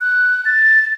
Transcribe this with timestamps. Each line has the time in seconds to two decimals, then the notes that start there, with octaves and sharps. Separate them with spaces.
0.01 F#6
0.45 A6